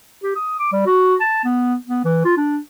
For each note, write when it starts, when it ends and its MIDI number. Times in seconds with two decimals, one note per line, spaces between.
0.23 0.32 67
0.36 0.56 87
0.59 0.71 86
0.72 0.83 55
0.86 1.15 66
1.20 1.42 81
1.44 1.75 59
1.87 2.04 59
2.04 2.21 52
2.25 2.35 65
2.37 2.58 62